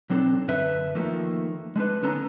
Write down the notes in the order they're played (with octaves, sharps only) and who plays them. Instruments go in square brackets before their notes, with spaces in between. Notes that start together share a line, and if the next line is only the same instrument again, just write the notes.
[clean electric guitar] B1 F#3 C4 D4 A4
F#2 D3 B4 E5
D#3 F3 A3 A#3
G#3 A3 D4 B4
D3 B3 C#4 A4 A#5